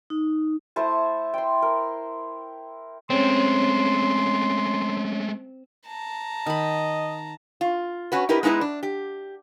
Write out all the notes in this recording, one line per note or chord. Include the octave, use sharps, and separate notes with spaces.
D#4
A3 E4 C5 A5
G5 C6
A#4
G#3 A3 C4 C#4 C#5 C6
A5 A#5
D#3 D#5 B5
F4
C#4 F#4 B4
D#4 E4 G4 A#4 B4
G#3 B3 D#4 E4 B4
D4
G4